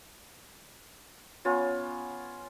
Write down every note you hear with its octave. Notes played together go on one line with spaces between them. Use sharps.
B3 C#4 F4